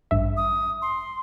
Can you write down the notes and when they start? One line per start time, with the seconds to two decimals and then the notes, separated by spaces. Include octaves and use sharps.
0.11 A1 G2 E5
0.37 D#6
0.82 C6